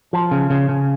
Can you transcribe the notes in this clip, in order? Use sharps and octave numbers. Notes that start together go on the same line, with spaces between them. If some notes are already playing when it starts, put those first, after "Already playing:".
F3
C#3
C#3
C#3